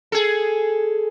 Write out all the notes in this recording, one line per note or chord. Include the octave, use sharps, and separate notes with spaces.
G#4 A4